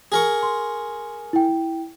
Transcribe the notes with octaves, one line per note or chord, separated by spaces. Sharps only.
G#4 A#4 C#6
C6
E4 G5